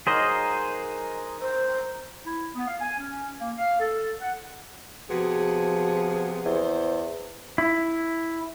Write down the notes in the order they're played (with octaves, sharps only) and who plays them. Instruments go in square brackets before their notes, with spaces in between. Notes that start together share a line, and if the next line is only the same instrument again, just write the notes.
[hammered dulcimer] F#3 D#4 A#4 [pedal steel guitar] G#4 C5 D#5
[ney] C5
[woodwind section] E4
B3
F5
G#5
C#4
A#3
F5
A4
F#5
[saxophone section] C3 B3 G#4 [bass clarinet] F3 [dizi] F#4
[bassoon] E2 [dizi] C5
[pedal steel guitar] E4